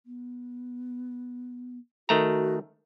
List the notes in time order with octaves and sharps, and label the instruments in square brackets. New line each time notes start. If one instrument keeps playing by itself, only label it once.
[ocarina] B3
[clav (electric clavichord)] D#3 A3 A#5 [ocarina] F#4